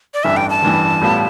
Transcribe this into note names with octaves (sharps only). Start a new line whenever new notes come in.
D5
A1 G2 E3 E5
G5
A5
A1 G2 E3
A2 G3 B3 F4